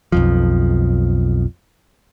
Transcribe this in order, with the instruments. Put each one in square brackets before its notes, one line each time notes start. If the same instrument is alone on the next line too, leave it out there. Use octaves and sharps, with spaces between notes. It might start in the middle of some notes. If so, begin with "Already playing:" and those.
[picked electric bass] B1 F2 F3